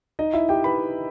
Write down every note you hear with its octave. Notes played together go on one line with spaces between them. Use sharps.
D#4 D#5
E4 E5
G4 G5
B4 B5